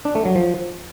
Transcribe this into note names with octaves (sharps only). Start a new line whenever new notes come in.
D4
A3
F#3
F3